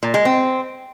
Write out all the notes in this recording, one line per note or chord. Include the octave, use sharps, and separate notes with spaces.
A#2
G#3
C4